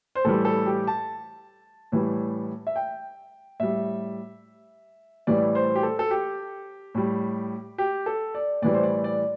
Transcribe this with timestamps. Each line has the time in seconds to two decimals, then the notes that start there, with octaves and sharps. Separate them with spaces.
0.15 C5
0.24 A2 E3 G3 A4
0.45 A4
0.66 G4
0.87 A5
1.92 A2 E3 G3
2.67 E5
2.76 G5
3.60 A2 G3 E5
5.27 A2 E3 G3 D5
5.55 C5
5.75 G4
5.83 A4
5.99 A4
6.11 G4
6.95 A2 G3
7.78 G4
8.06 A4
8.35 D5
8.62 A2 E3 G3 D5
8.74 C5
8.83 D5
9.04 D5